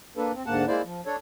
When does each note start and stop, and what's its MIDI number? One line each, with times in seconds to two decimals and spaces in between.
0.17 0.32 58
0.17 0.32 62
0.17 0.32 69
0.17 0.32 71
0.35 0.43 60
0.46 0.65 38
0.46 0.65 44
0.46 0.65 58
0.46 0.65 78
0.46 0.65 81
0.68 0.82 56
0.68 0.82 58
0.68 0.82 64
0.68 0.82 72
0.68 0.82 74
0.85 1.01 53
1.06 1.16 62
1.06 1.16 69
1.06 1.16 73